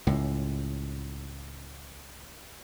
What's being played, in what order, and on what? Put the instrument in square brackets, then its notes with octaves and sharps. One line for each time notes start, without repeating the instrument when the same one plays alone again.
[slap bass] C#2 A2